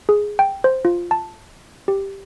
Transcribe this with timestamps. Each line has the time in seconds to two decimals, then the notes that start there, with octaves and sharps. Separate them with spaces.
0.09 G#4
0.39 G5
0.64 C5
0.85 F4
1.11 A5
1.88 G4